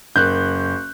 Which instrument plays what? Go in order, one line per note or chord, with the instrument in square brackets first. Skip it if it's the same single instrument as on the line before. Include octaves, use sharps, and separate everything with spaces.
[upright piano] F#1 [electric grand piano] F#6 G6